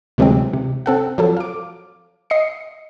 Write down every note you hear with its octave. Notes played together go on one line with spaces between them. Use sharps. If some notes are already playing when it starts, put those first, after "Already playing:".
D2 C3 E3 F#3 G#3 C4
C3
C4 A4 F#5
F3 F#3 A4
F5 D6
D#5 C7 C#7